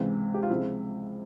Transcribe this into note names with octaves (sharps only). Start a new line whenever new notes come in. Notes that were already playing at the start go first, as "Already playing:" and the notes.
Already playing: C#2 C3 E3
G4
F4
C#2 C3 F3 E4